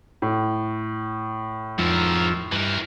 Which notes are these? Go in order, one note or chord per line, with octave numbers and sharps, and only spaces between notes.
A2
F2 G#2 F3 A#4 E6
G2 E3 A#4